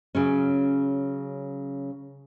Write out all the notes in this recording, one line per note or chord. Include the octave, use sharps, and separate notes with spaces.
C#3 F#3 C#4